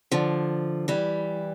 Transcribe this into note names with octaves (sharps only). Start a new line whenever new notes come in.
D3 F3
E3 G3